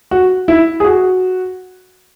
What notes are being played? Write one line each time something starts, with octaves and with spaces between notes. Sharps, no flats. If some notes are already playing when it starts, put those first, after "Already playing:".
F#4
E4
G#4
F#4